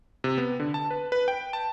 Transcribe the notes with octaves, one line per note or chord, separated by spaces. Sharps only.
C3
B3
D3
A5
B4
B4
G5
A5